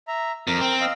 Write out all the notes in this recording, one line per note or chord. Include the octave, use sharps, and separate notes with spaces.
E5 A#5
F2 A#4
C4
D#5 F5 E6